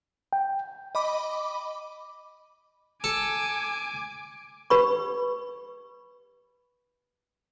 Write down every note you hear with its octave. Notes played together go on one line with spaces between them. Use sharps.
G5
D#5 B5 D6
A4 G#5 D6
G4 B4 B5 C#6